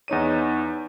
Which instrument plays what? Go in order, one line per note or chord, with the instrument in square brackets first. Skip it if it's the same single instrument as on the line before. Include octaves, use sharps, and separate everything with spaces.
[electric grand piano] E2 D#4 C#5 D#7